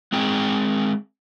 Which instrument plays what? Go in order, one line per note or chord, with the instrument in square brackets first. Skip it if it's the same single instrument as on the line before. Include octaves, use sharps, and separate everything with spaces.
[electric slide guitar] G#3 C4 G#4 G5